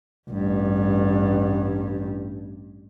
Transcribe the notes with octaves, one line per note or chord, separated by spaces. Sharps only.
A1 G2